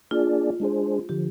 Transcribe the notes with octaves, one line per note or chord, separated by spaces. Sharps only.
A#3 D4 F4 G#4 D5
G#3 D4 G#4 C5
D3 F3 G4